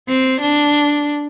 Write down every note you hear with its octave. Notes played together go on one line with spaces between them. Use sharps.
C4
D4